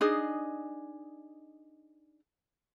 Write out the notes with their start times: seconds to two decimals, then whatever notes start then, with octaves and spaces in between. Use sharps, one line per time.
0.01 D4 D#4 G#4 D#5